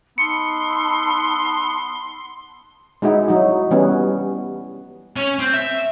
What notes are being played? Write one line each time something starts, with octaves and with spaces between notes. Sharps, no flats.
B3 D#4 A5 C6 E6 C#7
G#3 D#4 E4 F#4
F#3 D#4
E3 G3 B3 C#4
C#4
C4
E5